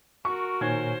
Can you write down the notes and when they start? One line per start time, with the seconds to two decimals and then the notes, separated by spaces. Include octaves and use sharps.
0.25 F#4 A#4 C#6
0.61 A#2 D#3 C5 C#5 G#5 G#6